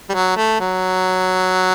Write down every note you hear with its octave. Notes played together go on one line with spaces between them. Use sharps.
G3
F#3
A3
F#3